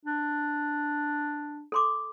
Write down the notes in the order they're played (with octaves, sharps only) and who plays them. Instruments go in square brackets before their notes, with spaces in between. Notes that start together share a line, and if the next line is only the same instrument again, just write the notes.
[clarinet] D4
[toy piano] A4 C6 D6